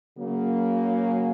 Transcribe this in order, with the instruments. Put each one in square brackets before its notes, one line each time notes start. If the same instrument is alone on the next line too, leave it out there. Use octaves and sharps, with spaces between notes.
[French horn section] C#3 F#3 A#3